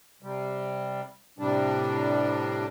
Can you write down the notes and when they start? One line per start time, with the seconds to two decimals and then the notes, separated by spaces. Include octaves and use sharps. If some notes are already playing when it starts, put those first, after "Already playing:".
0.22 C3 G3
1.39 A2 C3 G3 D4